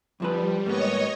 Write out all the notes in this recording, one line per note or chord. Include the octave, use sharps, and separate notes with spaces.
F2 F3 G3 B4
G#2 A#3 B3 C#5 D#5 C#6